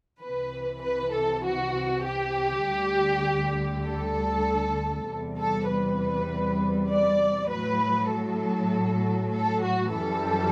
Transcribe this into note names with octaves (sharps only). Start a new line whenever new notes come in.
C2 C3 E3 B4
B4
A4
F#4
G4
D2 D3 G3
A4
E2 C3 G3
A4
B4
D5
A2 F#3 B4
A4
A4
F#4
F#2 E3 G3 A4